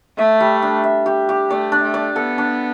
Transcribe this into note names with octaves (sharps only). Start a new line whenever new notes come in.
A3 E5
G3
D4
E5
G4
G4
A3 D5
D4
A3
D5
B3 A4
D4